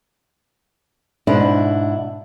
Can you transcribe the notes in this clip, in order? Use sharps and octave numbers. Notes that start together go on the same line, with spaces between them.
G#2 B2 D4 E4